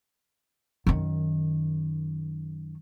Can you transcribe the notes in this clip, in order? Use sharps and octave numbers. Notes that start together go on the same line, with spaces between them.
F#2 D#3